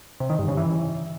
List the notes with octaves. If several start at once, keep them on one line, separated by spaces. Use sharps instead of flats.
C3
D#3
G2
C#3
E3